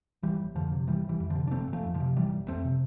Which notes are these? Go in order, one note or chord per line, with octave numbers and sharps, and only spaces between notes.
G1 E3 G3
G1
F2 D3 F3
C3
G1 E3 G3
G1
E3 G3
F2
D3 F3
C3
D4
G1 A3 C4
G1
F3 A3
F2
D3 F3
C3
G1 E3 G3
G1
F2 A3 C4
C3